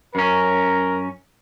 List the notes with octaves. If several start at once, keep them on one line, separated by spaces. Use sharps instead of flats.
F#2 C#4 A#4